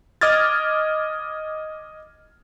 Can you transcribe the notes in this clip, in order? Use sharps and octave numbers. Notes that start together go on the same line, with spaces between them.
D#5 D6 D#6 F6 G#6 A6